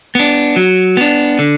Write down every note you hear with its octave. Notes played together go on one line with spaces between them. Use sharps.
B3 D4
F#3
B3 D4
D3